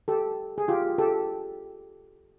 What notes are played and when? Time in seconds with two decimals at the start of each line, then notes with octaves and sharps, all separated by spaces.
0.08 G4 A4
0.58 G#4
0.68 F4 G4
0.98 G4 A4